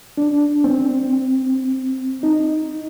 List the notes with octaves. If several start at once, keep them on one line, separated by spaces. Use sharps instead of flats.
D4
C4
D#4